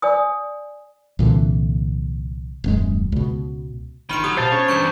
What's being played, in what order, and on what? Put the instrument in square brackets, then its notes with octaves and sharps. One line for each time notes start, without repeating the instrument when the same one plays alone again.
[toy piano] D5 G#5 D#6
[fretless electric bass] C2 A#2 D3 E3
D#1 F#2 G#3
C#2 B2
[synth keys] G1 C6 [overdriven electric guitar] D#3 [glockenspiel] B5 F6 D7
[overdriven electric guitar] F#3 [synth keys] G4 [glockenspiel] D#6
[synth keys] B2 C#7 [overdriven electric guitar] F4 [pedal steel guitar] C5 A5
[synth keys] C#4 D4 G#4 [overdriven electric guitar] C#5
[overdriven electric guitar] E2 G2 [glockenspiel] C#6 G6 C#7